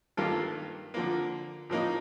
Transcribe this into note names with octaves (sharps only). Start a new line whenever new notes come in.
G2 D#3 A#3 F4 A4
D3 F3 A#3
A2 F3 A#3 D#4